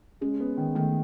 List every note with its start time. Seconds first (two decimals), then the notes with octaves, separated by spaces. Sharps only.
0.21 G#3 C#4
0.40 B3
0.57 D#3
0.75 D#3 A3